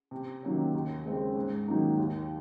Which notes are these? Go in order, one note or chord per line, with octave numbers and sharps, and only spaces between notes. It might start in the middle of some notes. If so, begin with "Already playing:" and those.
C3
D#3 F#3 A#3 C#4
D#2
C#3 G#3 C4
G#2
D#3 F#3 A#3 D#4
D#2